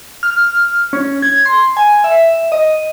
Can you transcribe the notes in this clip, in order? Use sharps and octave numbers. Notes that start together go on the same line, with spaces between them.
F6
C#4
G#6
C6
G#5
E5
D#5